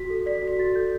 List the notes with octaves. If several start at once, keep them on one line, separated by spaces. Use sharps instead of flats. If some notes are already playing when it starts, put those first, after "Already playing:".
Already playing: F#4 B6
A4
D5 B6
F#4 B6
F#4 A6
A4 G6